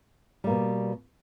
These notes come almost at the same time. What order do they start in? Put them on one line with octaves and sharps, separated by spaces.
G3 A#3 B2